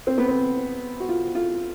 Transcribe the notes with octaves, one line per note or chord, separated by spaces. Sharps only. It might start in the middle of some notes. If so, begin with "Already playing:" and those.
C4
B3
C4
F#4
F4
F4